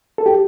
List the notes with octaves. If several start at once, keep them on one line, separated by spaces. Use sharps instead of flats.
A4
G4